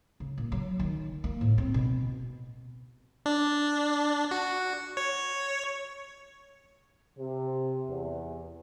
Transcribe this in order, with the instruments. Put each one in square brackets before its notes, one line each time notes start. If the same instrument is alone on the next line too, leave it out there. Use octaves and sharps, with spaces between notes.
[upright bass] C#3
A#2
F#3
D#3
A#3
A2
C4
B2
[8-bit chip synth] D4
F#4
C#5
[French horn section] C3
E2